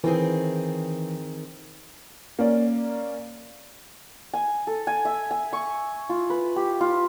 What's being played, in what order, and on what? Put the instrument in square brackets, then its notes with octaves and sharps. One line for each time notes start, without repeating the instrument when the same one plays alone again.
[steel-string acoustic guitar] D#3 C4 G#4 [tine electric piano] E3
[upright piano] A#3 C#4 D5
[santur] G#5
A4
G#5
E5
G#5
C#6
F4
B4
G4
F4